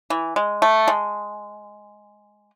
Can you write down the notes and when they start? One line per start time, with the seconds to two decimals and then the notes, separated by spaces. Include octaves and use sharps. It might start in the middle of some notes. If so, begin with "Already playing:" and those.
0.10 E3
0.36 G#3
0.62 A3
0.88 G#3